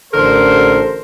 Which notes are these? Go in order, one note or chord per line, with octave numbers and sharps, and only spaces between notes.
A1 D3 A4 A#4 C5